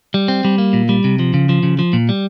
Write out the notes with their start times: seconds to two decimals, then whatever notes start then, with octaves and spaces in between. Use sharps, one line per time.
0.14 G3
0.28 C4
0.45 G3
0.58 A#3
0.73 A#2
0.89 G3
1.04 C3
1.19 F3
1.34 C#3
1.49 F3
1.63 C#3
1.79 F3
1.93 A#2
2.09 G3